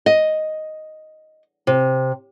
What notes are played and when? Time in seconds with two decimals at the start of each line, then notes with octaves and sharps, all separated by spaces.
0.06 D#5
1.67 C3